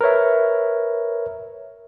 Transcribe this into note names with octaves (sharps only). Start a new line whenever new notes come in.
A#4 B4 C#5 E5